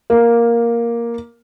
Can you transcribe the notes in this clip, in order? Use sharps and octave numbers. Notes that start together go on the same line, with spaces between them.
A#3